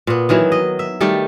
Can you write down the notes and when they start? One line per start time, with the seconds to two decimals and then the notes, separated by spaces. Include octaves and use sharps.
0.07 A#2 B3
0.29 D#3 E3 F#3 E4
0.52 D#5
0.79 E5
1.00 D#3 G3 A3 G4